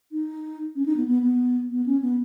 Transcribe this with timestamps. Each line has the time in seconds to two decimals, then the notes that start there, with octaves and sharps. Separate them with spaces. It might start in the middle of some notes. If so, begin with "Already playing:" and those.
0.12 D#4
0.76 C#4
0.86 D#4
0.97 B3
1.07 B3
1.23 B3
1.70 B3
1.86 C#4
2.02 B3